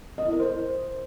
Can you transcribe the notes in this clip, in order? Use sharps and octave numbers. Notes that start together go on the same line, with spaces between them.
D#5
E4
A#4
C5